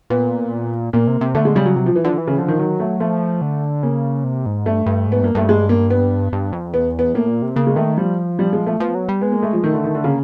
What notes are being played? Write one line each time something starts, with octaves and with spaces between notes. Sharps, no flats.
A#2 B3
A#2 A#3
C3
C3
D3 A3
G#3
C#3 G3
F#3
C3 F#3
F3
E3
D3 F3
E3
C#3
D3 F3
D#3
D#3 F#3
A3
F3 A3
D3
C#3 A#3
C3
G#2
G2 A3
G2
G#2 B3
G2 A#3
G2 A3
G#3
A#3
B3
G2
F2
E2 B3
B3
A2 A#3
A#2
C3
C#3 A#3
G#3
D#3 A3
F3 G3
G3
G#3
A3
F3 B3
F#3
G3
G#3 B3
A#3
A3
F3
D#3 A3
D3
D#3
D3
C#3 A#3